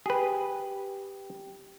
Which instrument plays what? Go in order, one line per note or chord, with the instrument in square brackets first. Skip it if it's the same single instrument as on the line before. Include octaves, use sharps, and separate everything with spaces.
[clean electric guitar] G4 [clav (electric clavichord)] G#4 B4